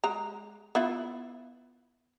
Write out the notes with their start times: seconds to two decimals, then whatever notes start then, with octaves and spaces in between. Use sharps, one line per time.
0.04 G#3 A#5
0.75 B3 E4 F4